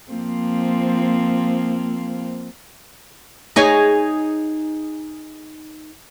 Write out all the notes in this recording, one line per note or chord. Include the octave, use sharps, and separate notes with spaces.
F3 A#3 C4
D#4 G#4 C#5